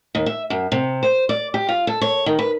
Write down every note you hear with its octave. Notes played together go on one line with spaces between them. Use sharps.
D#2
E5
F#2
C3
C5
D5
G4
F4
A4
C#5
D#3
B4